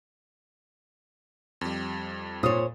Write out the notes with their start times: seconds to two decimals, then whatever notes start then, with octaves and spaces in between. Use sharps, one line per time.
1.61 F2 G3
2.43 A#2 C5 C#5 D#6